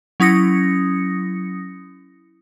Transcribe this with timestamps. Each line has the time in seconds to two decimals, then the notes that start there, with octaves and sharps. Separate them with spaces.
0.20 F#3 C#4 E4 D#6 A#6 C#7